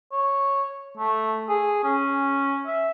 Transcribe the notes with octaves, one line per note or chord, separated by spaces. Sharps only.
C#5
A3
G#4
C#4
E5